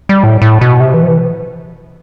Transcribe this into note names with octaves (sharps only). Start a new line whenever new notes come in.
G3
A2
A2
B2
C3
E3
F3
E3